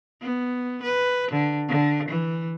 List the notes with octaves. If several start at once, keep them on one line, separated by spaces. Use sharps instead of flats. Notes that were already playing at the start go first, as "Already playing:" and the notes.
B3
B4
D3
D3
E3